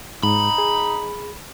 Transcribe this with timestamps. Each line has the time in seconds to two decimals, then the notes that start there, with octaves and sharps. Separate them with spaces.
0.23 G#2 D#4 B5
0.58 G#4